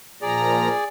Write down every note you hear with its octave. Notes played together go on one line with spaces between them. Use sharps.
A#2 F3 G#4 D5 A#5